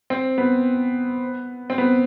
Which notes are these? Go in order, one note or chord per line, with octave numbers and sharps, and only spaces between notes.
C4
B3
C4
B3